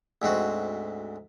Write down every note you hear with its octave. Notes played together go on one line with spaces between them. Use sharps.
D2 G#2 C4 F#4